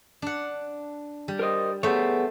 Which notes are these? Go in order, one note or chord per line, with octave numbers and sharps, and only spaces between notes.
D4 F#5
G3
A#4 C5 D#5
A3 B3 G#4 C5 C#5